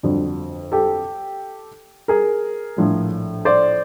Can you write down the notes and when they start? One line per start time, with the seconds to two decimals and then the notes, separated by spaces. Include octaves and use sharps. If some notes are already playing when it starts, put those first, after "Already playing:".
0.03 G1 F2 D3 F#3
0.72 G4 A4
2.08 G#4 A#4
2.77 A#1 A2 F3 A3
3.45 C5 D5